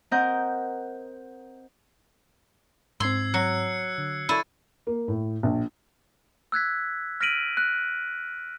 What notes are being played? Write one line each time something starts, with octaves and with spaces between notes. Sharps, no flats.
C4 A#4 D#5 F#5 G6
G#2 C4 C6 E6 G#6 C7
F#3 F#6 C7 C#7
D3
E4 A4 D5 C#6 A6 D#7
A#3
A2
A#1
E6 F#6 G#6 B6
F6 A#6 B6 D7 D#7 F#7
F#6